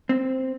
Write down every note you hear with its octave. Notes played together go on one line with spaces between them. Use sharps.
C4